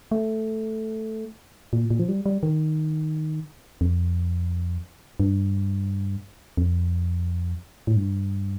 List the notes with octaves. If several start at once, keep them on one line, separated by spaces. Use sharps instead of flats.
A3
A#2
A#2
F3
G3
G3
D#3
F2
G2
F2
A2
G2